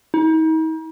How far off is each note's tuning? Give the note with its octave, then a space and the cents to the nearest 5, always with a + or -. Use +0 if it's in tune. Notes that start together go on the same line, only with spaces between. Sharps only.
D#4 +40